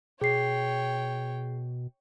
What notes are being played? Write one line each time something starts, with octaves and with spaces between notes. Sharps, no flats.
B2 G#4 C#5 G5 C7